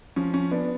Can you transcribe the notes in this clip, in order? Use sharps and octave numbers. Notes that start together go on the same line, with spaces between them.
F3 C#4
C#4
B3 D4